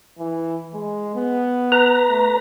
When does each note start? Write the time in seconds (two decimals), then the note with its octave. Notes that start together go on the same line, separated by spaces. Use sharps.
0.19 E3
0.74 G#3
1.15 B3
1.72 B4 A#5
2.09 A3